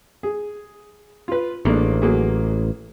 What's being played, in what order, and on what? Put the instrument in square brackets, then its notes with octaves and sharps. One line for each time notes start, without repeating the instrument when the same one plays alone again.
[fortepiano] G#4
F4 B4
[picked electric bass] A1 [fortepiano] G#3 A#3 D4
[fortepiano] F#3 A#3 G#4